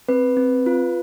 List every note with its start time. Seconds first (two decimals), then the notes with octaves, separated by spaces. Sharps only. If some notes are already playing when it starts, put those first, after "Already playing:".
0.09 C4 B4
0.37 C4
0.66 F4